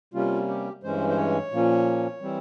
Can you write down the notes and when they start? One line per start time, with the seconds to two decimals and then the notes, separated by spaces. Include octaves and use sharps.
0.14 C3 G3 A#3 C#4 F4
0.48 G4
0.83 G2 E3 G#3 C#4 C5
1.09 C5
1.17 C#5
1.52 A#2 F3 A#3 C#4
2.21 E3 G3 C4